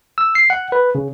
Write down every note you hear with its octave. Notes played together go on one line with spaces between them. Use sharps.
E6
C7
F#5
B4
C#3